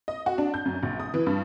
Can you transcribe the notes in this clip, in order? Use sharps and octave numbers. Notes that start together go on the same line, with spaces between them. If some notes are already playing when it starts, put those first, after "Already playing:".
D#5
F#4
D4
G6
F#2
A#1
D#6
E3
G2